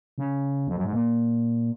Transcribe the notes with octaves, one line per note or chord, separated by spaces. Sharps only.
C#3
F2
F#2
G#2
A#2